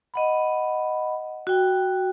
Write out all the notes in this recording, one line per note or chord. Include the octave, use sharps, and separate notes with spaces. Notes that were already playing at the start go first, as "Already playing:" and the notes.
D#5 F#5 B5
F#4 G5